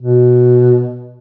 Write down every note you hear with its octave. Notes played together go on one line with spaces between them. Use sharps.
B2